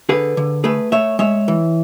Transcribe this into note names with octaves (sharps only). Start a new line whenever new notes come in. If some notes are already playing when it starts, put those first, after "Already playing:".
D3 G#4 B4
D3
A3 G#4 B4
A3 C#5 E5
G#3 C#5 E5
E3